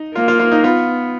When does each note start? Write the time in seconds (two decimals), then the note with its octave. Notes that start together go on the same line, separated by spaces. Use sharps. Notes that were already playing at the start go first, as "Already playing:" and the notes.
Already playing: D#4
0.15 A#3 F4
0.28 F4
0.39 F4
0.52 D#4
0.64 B3 F4